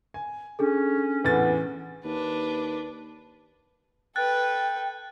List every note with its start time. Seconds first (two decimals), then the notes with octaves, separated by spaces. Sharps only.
0.14 G#5
0.59 C#4 D4 G#4 A4
1.25 E2 A2 B3 A6
2.05 D#2 D4 B4
4.16 A4 B4 G5 F#6 A6